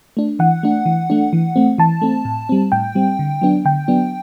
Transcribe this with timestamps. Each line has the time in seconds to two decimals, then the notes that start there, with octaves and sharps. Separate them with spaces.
0.17 A3 D4
0.39 E3 F#5
0.63 A3 D4
0.86 E3
1.10 A3 D4
1.33 E3
1.56 A3 C4
1.78 E3 A5
2.02 A3 C4
2.25 A2
2.49 G3 C4
2.72 A2 G5
2.95 G3 C4
3.19 D3
3.42 F#3 B3 D4
3.65 D3 G5
3.88 F#3 B3 D4